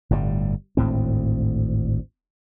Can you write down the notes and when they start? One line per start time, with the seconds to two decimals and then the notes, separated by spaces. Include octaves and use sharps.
0.10 G1 A2 C3 G3
0.77 G#1 D2 A2 C4